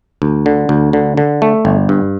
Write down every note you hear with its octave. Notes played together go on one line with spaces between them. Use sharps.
D2
D3
D2
D3
D3
A3
G1
G2